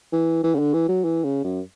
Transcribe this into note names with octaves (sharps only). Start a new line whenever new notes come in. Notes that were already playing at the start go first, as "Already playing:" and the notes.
E3
E3
C#3
D3
E3
F#3
E3
C#3
F#2